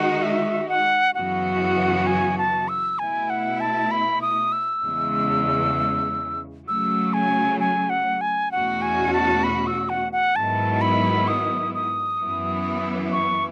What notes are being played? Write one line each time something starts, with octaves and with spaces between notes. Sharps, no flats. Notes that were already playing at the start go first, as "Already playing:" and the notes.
Already playing: D#3 G#3 D#4 F#4 F#5
E5
F#5
F#2 C#3 E3 B3 F#4 F#5
G#5
A5
E6
B2 A3 E4 G#5
F#5
A5
B5
D#6
E6
E2 C#3 G#3
C#3 F#3 A3 E6
G#5
G#5
F#5
G#5
E2 B2 A3 C#4 F#4 F#5
G#5
A5
B5
E6
F#5
F#5
G#2 D#3 F#3 B3 E4 A5
B5
D#6
D#6
F#2 E3 B3 E4
C#6